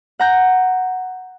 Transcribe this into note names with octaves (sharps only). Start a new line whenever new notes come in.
F#5 A#5 G6